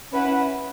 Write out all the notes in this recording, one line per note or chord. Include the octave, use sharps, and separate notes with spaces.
C#4 E4 B4 F#5